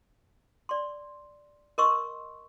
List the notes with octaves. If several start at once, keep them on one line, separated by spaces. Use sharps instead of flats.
D5 C6
A#4 D#5 C6 C#6 E6